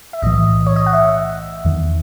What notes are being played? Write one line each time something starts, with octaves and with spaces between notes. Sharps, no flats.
E5
B1 A2 E3 D#5
C#5
D#5
F#5
E5
E2 D#3